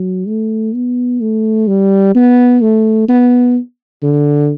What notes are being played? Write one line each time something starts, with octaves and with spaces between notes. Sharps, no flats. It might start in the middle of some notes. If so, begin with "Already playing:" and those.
Already playing: F#3
A3
B3
A3
G3
B3
A3
B3
D3